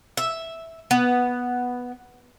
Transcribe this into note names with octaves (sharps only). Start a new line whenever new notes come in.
E5
B3